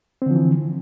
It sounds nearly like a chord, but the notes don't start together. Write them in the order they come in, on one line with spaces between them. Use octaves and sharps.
C4 D3 F3 E3